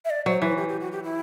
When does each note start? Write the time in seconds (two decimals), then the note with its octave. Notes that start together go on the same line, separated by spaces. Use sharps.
0.05 E5
0.10 D5
0.26 F#3 C5
0.42 E3 B4
0.57 G4
0.68 G4
0.80 F#4
0.92 G4
1.04 E4